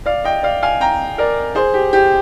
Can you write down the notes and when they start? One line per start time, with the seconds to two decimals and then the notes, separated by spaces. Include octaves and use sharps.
0.06 D5 F5
0.24 D#5 G5
0.43 D5 F5
0.63 F5 G#5
0.81 G5 A#5
1.18 A#4 D5
1.55 G#4 C5
1.74 G4
1.93 G4